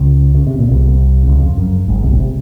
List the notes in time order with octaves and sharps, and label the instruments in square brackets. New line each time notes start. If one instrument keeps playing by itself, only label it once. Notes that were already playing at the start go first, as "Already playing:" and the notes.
Already playing: [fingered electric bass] C#2 C#3
C#3
C3
A#2
C2 C3
C#2 C#3
F2
F#2
G#1 G#2
C2 C3
A#2
C3